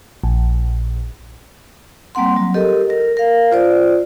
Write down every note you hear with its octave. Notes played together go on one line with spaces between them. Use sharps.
A#1
G3 A#3 C4 F#5 C6
F#3
G4 A4 A#4 D#5
A#4
A#4 F5
F4 C5 D5